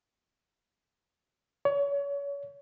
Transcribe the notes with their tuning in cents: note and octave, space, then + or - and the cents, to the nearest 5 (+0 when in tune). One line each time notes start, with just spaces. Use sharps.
C#5 +30